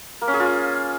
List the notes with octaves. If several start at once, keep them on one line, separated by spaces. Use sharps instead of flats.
A#3
C#4
G#4
F4